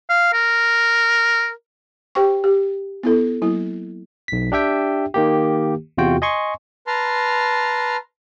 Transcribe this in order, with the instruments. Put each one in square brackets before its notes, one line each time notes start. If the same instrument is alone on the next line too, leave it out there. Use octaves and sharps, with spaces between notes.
[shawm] F5
A#4
[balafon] G4 C5 G5 C#6
G4
B3 E4 A4
F#3 A#3 E4
[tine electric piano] B1 B6
D4 G4 E5 G5
D#3 A#3 G4
E2 C3 F4 F#4 G5
D#5 G#5 C6 C#6
[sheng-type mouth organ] B4 A5 A#5 C6 F6